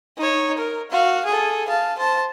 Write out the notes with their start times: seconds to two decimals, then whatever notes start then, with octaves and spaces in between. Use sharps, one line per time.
0.18 D#4 C#5
0.58 A#4
0.91 F#4 F5
1.25 G#4 A4
1.68 F5 A5
1.98 C5 A5